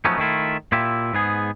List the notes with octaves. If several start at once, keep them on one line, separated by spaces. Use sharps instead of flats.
F3 F#3 A3 B3 C#4 D#4
D#3 A3 E4 F4
A#2 E4 F4 G4 E5
G#2 B3 G#4